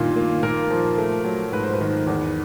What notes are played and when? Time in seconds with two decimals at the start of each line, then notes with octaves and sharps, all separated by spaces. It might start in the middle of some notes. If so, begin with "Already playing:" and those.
Already playing: G2 A#2 D#3 F4
0.16 A#3
0.43 A#2 A#4
0.70 F3
0.98 A3
1.25 F#3
1.52 G#2 B4
1.64 C5
1.73 B4
1.80 D#3
2.07 E2